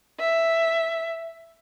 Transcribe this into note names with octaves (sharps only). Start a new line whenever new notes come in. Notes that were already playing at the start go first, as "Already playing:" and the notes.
E5